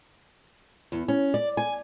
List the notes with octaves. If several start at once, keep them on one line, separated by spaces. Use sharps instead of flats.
E2
C#4
D5
G#5